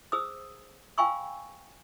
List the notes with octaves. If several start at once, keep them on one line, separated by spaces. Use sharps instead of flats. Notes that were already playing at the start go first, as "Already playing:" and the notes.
G#4 C5 D#6 E6
F5 G5 G#5 B5 C#6 E6